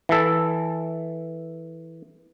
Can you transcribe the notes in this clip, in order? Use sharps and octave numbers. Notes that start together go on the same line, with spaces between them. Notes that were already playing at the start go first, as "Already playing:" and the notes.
E3 A4